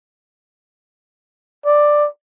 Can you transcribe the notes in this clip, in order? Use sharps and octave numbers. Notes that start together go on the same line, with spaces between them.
D5